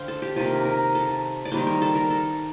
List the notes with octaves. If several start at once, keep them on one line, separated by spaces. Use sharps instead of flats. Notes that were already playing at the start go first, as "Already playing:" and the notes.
Already playing: D3 C5 F5 G5
A4
G4
C3 D#3 A#3 F4
A#4
A4
D5
D#3 G3 A#3 C5
A#4
A4
A#4
A4